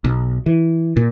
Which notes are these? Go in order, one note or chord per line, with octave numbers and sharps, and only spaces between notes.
B1
E3
A#2